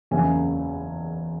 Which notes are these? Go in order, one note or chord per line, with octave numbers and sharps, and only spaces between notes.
F#1 E2 C#3 E5 G#5